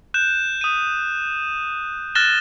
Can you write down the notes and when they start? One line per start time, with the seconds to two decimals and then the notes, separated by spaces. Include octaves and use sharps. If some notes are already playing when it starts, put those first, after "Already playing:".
0.14 F#6 G6 E7
0.61 D#6 D#7
2.15 F6 F#6 A6 A#6 E7 G7